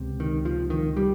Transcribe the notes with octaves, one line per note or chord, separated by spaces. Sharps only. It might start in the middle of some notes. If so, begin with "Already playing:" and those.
Already playing: C#2 C3
D#3
F3
D#3
G3